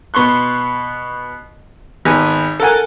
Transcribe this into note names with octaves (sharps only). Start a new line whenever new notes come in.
B2 B3 C6 C#6 F#6
G#1 B3 G#5
A4 A#4 F#5 G#5